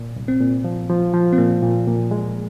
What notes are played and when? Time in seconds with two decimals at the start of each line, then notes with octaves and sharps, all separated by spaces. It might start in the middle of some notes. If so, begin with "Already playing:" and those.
Already playing: A#2
0.16 C2
0.28 C4
0.40 A#2
0.64 F3
0.90 F3
1.14 F3
1.33 C4
1.38 A#2 A#3
1.62 A#2
1.87 A#2
2.11 G#3